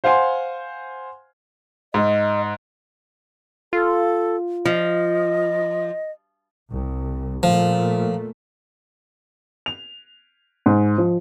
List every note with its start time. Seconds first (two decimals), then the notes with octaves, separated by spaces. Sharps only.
0.04 C5 F5 F#5 G#5 C6
1.94 G#2 D#5
3.73 F4 A4
4.65 F3 D#5
6.70 C2
7.43 A#2 F3 A3
9.66 F7
10.66 G#2
10.98 F3